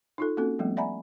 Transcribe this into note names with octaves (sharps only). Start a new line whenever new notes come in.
D#4 F4 A4
A#3 C4 C#4 F#4 A4
F3 G3 A3 B3 C4
D5 E5 F#5 G#5 A#5 B5